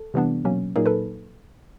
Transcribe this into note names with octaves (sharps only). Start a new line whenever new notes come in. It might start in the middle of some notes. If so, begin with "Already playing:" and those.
Already playing: A4
C3 E3 G3 B3 D4
B2 F#3 A#3 C#4
A#2 F#3 A#3 D#4 G#4 A#4
A4 B4